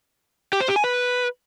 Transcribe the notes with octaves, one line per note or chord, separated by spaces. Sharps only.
G4
C5
G4
G#5
B4